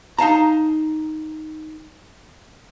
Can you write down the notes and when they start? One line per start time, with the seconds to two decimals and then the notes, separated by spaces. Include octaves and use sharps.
0.18 D#4 F5 A5 A#5